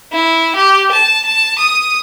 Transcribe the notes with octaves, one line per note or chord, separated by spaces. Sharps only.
E4
G4
A5
A5
D#6